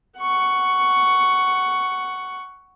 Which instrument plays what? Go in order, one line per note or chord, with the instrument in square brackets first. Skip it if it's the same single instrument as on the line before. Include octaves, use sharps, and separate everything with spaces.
[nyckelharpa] F#5 C#6